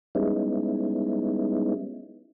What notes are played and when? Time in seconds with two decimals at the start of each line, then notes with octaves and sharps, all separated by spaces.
0.15 G3 G#3 B3 C#4 D#4 E4